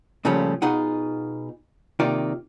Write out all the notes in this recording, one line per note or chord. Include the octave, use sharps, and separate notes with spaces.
A#2 C#3 F3 G3 A3 C#4
B2 D#4 F4 G#4 F#5
C3 D#3 A#3 F4 D5